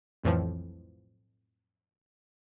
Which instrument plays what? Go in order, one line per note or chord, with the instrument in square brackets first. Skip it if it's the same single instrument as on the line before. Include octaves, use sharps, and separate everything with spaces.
[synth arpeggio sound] B1 F2 A2 E3 F3